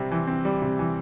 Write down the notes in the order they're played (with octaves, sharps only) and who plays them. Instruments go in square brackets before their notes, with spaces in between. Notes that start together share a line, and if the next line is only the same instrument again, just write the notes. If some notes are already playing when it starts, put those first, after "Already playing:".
Already playing: [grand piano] C3 G3 C4
E3
C4
G3
C3
E3